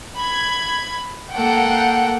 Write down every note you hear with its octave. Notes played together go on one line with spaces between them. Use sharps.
B5 G#6
A#3 A4 F#5 G5